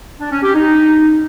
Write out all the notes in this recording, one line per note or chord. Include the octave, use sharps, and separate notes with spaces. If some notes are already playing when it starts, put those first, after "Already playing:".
D4
C#4
G4
D#4